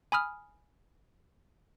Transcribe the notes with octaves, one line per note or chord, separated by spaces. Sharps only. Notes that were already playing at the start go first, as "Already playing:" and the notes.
G#5 B5 D#6 F6